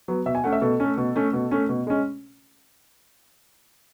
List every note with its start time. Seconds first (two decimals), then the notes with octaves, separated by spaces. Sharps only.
0.08 F#3 B3
0.26 B2 E5
0.35 G#5
0.44 A3 C#4 F#5
0.53 E5
0.61 B2 A4
0.80 A3 C#4
0.97 B2
1.16 A3 C#4
1.33 B2
1.51 A3 C#4
1.69 B2
1.87 G#3 C#4